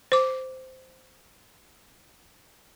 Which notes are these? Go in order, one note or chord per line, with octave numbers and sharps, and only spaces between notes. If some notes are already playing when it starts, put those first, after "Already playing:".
C5 D6